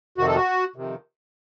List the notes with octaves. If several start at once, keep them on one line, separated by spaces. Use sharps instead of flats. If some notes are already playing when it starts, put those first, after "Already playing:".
F2 C3 D#3 F#4
A4
F#4
F2 C3 D#3